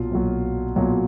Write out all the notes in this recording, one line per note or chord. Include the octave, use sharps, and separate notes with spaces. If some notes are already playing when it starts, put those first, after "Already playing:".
Already playing: B1 A#2 F#3 F4
B1 A#2 F#3
B1 A#2 F#3